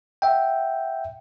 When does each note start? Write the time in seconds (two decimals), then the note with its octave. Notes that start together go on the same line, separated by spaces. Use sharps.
0.22 E5 F#5 G5